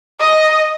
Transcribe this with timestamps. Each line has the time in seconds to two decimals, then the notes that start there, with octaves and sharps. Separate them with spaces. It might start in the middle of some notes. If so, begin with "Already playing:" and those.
0.20 D#5